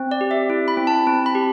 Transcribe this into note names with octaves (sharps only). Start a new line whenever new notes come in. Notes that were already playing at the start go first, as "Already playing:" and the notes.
Already playing: C4
D5
G4
E5
E4
B5
C4
A5
C4
B5
G4